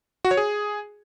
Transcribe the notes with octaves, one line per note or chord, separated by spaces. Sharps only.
F#4
C#5
G#4